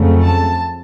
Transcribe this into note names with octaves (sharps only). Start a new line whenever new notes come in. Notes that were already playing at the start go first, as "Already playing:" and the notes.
Already playing: F2 C#3 F#3 A3
A5